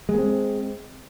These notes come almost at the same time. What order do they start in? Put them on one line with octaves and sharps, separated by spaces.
G#3 A#3 C4